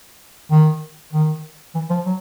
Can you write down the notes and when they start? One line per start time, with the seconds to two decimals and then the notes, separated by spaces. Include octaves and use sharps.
0.51 D#3
1.13 D#3
1.75 E3
1.90 F3
2.06 F#3